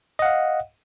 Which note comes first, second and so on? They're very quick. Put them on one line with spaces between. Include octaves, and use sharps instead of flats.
D#5 F#5 F5